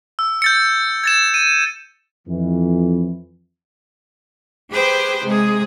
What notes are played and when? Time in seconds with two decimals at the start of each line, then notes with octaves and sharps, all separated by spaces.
0.19 E6
0.42 G6 A6 C#7
1.04 G#6 A6 E7
1.34 D#7
2.28 F2 E3
4.70 G4 G#4 B4 C5 G5
5.23 C3 G#3 G#4